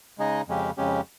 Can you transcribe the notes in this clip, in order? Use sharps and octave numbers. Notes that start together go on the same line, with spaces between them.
C#3 G#3 D#4 G#4 D#5
F2 C#3 G#3 C#4 G4
F2 C#3 G#3 C#4 G4